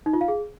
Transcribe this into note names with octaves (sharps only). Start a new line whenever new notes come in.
D#4
F4
F5
G#4